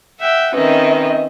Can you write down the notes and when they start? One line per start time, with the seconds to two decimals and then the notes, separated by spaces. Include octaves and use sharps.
0.19 E5 F#5 G5
0.54 D#3 C4 C#4 B4 D#5 E5